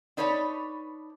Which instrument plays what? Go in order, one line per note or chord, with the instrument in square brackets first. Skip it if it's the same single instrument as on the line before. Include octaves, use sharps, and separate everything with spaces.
[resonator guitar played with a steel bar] D4 D#4 B4 C#5 D#5 A5